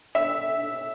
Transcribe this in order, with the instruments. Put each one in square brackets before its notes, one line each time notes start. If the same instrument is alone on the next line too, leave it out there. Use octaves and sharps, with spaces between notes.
[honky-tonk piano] E5